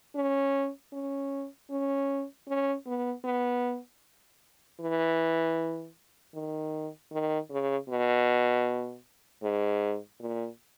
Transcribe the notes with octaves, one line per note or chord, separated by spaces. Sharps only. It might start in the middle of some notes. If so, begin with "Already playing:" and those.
C#4
C#4
C#4
C#4
B3
B3
E3
D#3
D#3
C#3
B2
G#2
A#2